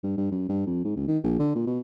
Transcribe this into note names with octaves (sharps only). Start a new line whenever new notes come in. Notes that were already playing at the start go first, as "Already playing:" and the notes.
G2
G2
F#2
G2
F2
G#2
C#2
D#3
A#1
D3
A#2
B2